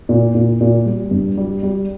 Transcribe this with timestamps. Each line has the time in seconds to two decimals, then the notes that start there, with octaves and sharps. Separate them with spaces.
0.09 A#2
0.35 A#2
0.61 A#2
0.86 G3
1.11 G2
1.37 G3
1.63 G3